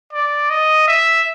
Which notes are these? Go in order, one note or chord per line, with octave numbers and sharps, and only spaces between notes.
D5
D#5
E5